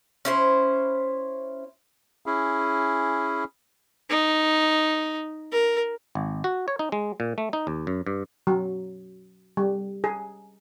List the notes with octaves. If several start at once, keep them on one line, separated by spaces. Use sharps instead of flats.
C#4 E4 C5
C#4 E4 G#4
D#4
A#4
G#1
F#4
C#5
D#4
G#3
A#2
A3
D#4
D#2
F#2
G2
F#3
G3
G#4